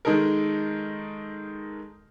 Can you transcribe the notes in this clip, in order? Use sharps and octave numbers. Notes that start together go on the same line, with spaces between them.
D#3 G#3 D#4 A4 A#4